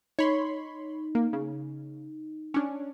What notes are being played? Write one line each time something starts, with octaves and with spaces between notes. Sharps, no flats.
D#4 C#5 B5 C6
A#3
C#3
C#4 D4